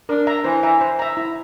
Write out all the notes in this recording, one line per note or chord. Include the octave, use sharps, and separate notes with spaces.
D4 A#4
E5 A#5
E3 C5
E5 A#5
C5
E5 A#5
E4